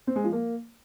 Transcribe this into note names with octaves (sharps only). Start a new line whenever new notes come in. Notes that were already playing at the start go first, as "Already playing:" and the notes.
C4
G#3
F3
A#3